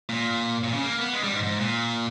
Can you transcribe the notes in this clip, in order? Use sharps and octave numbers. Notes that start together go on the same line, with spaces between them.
A#2
A#2
C#3
A#3
B3
G#3
G3
G#2
G#2
A#2